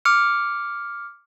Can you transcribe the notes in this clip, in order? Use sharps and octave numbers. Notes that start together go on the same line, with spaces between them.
D6 F6 C#7